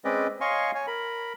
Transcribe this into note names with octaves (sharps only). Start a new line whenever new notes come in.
G#3 C4 C#4 B4 D5 D#5
C#5 D#5 F5 G#5 C6 C#6
C#5 G#5
A#4 B5